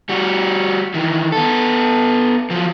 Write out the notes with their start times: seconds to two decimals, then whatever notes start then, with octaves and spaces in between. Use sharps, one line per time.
0.09 G3 F#4
0.94 D#3 E3
1.32 B3 A4
2.50 F3 F#3